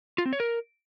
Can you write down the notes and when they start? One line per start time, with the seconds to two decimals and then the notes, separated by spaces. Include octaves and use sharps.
0.18 F4
0.25 C4
0.33 C#5
0.40 A#4